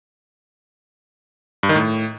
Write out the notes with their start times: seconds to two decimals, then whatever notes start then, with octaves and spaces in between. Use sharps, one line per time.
1.63 G2
1.69 D#3
1.75 A2